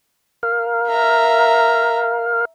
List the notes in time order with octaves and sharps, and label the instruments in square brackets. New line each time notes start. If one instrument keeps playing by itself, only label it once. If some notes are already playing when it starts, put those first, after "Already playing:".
[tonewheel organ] A#4 F5
[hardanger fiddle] E5 A#5